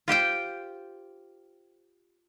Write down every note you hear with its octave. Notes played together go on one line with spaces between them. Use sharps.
F4 G4 C5 G5